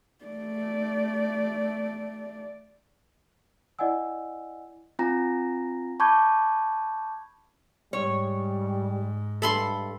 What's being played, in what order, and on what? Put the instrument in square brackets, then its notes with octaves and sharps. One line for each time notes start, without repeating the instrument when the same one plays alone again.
[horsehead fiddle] A3 D5
[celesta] E4 D5 D#5 F#5 G#5 E6
[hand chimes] C4 F4 G#5 A#5 A#6
A5 B5 C#6 D6 G6 G#6
[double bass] G#2 [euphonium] G3 [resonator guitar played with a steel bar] C#5
[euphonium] G2 [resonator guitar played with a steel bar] A4 [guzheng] E5 B5 C6